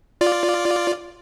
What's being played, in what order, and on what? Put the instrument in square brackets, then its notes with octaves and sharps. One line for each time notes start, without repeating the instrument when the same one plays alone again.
[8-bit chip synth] F4 D5